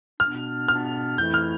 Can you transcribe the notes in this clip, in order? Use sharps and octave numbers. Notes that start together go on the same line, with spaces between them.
B2 B3 D4 F6
B2 B3 D4 F6
F2 E3 A3 E4 G6
F6